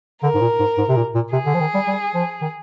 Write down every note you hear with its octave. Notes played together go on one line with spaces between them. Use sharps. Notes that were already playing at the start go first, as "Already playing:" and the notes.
D3 A#4
G#2
A#2
G#2
G#2
C3
A#2
A#2
C3 G#4
D3
F3
D#3
G3
G3
F3
D#3